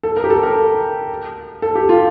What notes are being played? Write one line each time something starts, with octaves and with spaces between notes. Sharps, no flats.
A4
A#4
G4
A4
A#4
A4
G4
F4